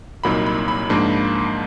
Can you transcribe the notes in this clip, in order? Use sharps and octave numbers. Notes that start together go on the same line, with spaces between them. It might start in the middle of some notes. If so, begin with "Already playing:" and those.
C2 A#2 F#3 A#3 D#4 B5
B5
B5
G#2 F3 A#3 D4